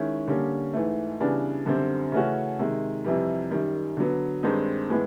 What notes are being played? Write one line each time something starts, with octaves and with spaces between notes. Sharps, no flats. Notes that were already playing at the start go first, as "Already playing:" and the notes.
Already playing: D#3 G#3 C#4 E4
D3 G3 A#3 C#4
G#2 E3 A3
C#3 E3 G3 B3 D4
F#2 D3 G3 C4
C#3 E3 A3 C#4 F#4
C3 D#3 G#3
F2 C3 E3 G3
F#2 D#3 G3
D3 F#3 B3
G2 D#3 G#3 C4 D#4
A2 E3 G#3 B3